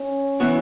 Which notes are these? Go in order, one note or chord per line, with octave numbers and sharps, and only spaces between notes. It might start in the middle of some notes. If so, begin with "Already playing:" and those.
Already playing: C#4
E3 B3 F#4